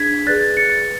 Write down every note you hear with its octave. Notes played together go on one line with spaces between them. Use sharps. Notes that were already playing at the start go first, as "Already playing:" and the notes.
Already playing: D4 G#4 G#6 B6
G#4 B4 D5 F#6 A6
A6 C#7